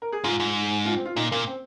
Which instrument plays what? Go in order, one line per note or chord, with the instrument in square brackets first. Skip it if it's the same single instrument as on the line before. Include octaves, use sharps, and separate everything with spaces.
[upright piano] A#4
G#4
[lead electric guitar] G#2 [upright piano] F4
[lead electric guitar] G#2
[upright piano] F4
C4
F4
[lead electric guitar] A#2 [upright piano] D#4
[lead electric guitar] A#2 [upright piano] A#3
[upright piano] C4